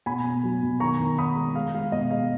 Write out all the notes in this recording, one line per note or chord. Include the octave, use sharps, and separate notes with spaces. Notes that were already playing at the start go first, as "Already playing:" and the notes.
B2 G#5 B5
B2
F#3
B2
D#3 A#5 C#6
D#3
D#3 B5 D#6
G#3
G#3 F5
G#3 F5
B2 D#5
G#3 F5